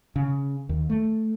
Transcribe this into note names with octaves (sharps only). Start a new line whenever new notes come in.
C#3
D#2
A3